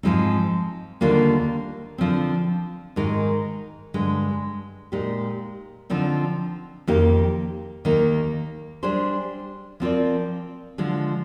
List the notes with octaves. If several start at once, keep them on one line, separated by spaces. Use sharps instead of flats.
G#2 F3 G#3 C4 D#4
D#2 D3 G3 A#3 F4
D3 F3 C4
G#2 D#3 G#3 D#4 A#4
G2 D3 G#3
A#2 G#3 D#4 G4
D3 F3 C4 D#4
F2 D#3 A#3 D#4 G4
D#2 D#3 A#3 D#4
G3 D4 G#4 C5
F3 C4 F4 A#4 D5
D3 F3 G#3